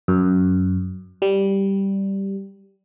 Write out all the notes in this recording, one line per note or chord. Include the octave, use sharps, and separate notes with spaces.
F#2
G3